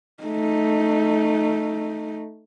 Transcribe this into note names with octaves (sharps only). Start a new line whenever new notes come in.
A3 D#4